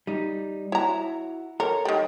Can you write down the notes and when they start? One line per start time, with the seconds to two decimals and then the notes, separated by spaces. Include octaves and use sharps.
0.07 G3 D#4
0.72 E4 F#4 C#5 A#5
1.60 A4 A#4 C#5
1.85 D#3 G3